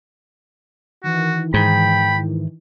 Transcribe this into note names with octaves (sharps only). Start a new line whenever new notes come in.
D#3 E3 F#4
G#2 G5 B5